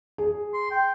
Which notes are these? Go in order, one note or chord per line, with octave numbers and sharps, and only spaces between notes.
G#4
C6
G5